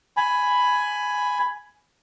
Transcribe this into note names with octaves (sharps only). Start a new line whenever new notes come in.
G#5 B5